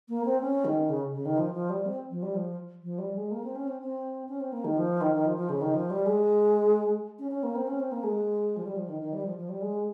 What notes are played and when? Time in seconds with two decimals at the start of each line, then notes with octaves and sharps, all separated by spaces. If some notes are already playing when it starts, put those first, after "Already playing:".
0.08 A#3
0.24 C4
0.40 C#4
0.64 D#3
0.89 C#3
1.12 C#3
1.25 D#3
1.37 F3
1.53 F3
1.69 G3
1.85 C4
2.10 F3
2.22 G3
2.34 F3
2.83 F3
2.98 G3
3.15 G#3
3.31 A#3
3.43 C4
3.55 C#4
3.67 C4
3.79 C4
4.28 C#4
4.40 C4
4.52 A#3
4.64 D#3
4.77 F3
5.01 D#3
5.13 D#3
5.25 F3
5.37 F3
5.49 C#3
5.61 D#3
5.73 F3
5.90 G3
6.05 G#3
7.18 C#4
7.31 C#4
7.43 A#3
7.55 C4
7.67 C#4
7.79 C4
7.91 A#3
8.03 G#3
8.56 F3
8.64 G3
8.76 F3
8.88 D#3
9.00 D#3
9.12 G3
9.25 F3
9.36 F3
9.49 G3
9.61 G#3